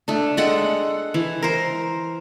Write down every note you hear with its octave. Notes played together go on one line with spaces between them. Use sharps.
A3 D4
G#3 A4 F#5 G5
E3
A#4 C5